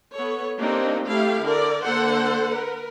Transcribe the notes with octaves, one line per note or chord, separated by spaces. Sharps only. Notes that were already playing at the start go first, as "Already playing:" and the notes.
B3 A4 C#5
A#3 C4 D4 D#4 G4
A3 E4 G4 F5
D3 A#4 D5
D3 A#3 A4 C5 F#5
A#4 B4